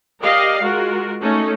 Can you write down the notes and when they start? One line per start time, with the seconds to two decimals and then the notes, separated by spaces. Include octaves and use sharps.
0.22 G4 A#4 D5 D#5 F5
0.62 G#3 F4 F#4 A#4
1.20 A3 C#4 D#4